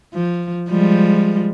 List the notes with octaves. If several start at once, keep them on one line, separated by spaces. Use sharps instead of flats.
F3
F3 G3 G#3